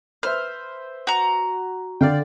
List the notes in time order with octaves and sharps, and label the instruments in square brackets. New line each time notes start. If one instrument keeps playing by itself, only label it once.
[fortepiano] B4 C5 E5 [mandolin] F6
[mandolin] F#4 A#5
[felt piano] D3 [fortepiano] D5 F5 G5